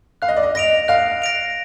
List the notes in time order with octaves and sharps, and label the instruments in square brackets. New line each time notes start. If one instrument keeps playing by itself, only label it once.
[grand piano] F5 [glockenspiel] F#6
[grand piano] D#5
D5
D#5
[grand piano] D#5 [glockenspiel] A#6 D7 F7
[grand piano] F5 [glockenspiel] F#6
[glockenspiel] A#6 D7 F7